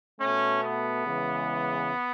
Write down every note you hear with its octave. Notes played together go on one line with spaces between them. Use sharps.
B2 A3 C#4
B3
C#3 E3 G#3